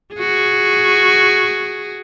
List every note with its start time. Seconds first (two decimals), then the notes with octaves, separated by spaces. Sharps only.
0.14 F#4 G#4